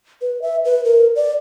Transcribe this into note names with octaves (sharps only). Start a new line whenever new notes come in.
B4
E5
B4
A#4
D5